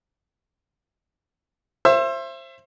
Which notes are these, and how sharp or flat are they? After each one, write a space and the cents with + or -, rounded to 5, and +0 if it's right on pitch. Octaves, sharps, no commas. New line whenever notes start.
C5 +25 E5 +30